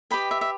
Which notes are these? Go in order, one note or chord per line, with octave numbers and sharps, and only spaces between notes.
G4 B4 D#5 G5 B5
E5
E5